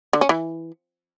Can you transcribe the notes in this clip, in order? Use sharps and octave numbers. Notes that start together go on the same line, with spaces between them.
D3
C#4
E3